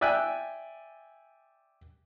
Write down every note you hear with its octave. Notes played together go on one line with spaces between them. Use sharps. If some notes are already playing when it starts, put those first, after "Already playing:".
D5 E5 G5 G#5 F#6